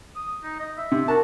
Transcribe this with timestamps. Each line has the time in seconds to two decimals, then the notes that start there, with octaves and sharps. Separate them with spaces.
0.16 D#6
0.44 D#4
0.60 D#5
0.77 E5
0.91 C3
1.08 F#4 A#4 A5